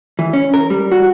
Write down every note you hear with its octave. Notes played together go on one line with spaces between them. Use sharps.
E3
C#4
A#4
G3
F#4